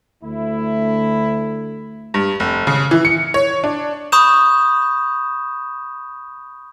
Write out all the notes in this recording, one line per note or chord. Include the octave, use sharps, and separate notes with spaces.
D2 A3 E4
G2
F1
C#3
E3
C#7
C#5
D4
B5 C#6 D#6 G6 E7